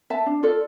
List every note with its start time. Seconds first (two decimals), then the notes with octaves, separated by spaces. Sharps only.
0.10 E5 A5
0.26 D4
0.43 F4 A4 D5